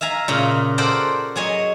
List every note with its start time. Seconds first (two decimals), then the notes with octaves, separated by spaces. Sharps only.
0.01 E5 F5 G#5 A#5
0.28 A#2 C#3
0.78 A4 A#4 C5 D5 F#5 G5
1.36 F#3 G#4 C#5 D#5